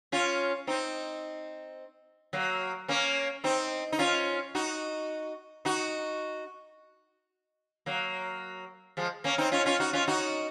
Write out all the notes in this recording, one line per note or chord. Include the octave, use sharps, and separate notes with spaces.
C#4 F4
C4 D#4
F#3 A#3
A#3 C#4
C4 D#4
D#4
C#4 F4
D#4 F#4
D#4 F#4
F#3 A#3
F3 G#3
A#3 C#4
C4 D#4
C#4 F4
C#4 F4
D#4 F#4
C#4 F4
D#4 F#4